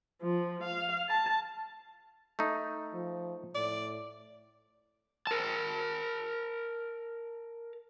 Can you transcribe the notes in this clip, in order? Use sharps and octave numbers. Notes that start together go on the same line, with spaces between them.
F3
F5
A5
A3 D#4
F3
A2 D5
A#4 A5